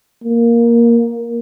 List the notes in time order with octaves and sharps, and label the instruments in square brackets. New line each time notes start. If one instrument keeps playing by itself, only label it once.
[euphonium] A#3